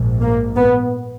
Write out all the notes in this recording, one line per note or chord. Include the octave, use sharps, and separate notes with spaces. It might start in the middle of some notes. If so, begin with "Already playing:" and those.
Already playing: A#1 G#2
A#3
B3